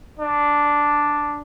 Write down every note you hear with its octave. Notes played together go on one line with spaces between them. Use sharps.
D4